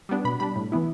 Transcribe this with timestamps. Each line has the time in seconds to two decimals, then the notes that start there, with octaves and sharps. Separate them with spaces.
0.09 G3 B3 D4
0.25 B2 B5
0.40 G3 D4 B5
0.56 A2
0.72 E3 B3 E4